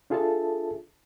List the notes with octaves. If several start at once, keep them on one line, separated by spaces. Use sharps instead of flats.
D4 F4 G#4 A4 E5 A5